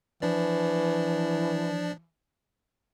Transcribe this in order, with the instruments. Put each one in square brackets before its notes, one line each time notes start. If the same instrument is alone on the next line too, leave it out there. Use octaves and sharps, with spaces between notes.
[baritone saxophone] E3 [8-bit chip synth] F3 D4 D5